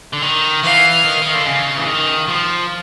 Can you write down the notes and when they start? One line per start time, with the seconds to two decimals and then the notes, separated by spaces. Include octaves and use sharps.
0.13 D3
0.22 D#3
0.63 E3 F5
1.05 D#3
1.22 D#3
1.34 D3
1.46 C#3
1.76 E3
1.87 D#3
2.28 F3